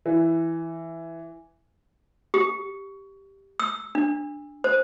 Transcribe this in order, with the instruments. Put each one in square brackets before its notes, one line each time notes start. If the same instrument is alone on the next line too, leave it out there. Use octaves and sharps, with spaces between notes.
[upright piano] E3
[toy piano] G4
E6
D4
C5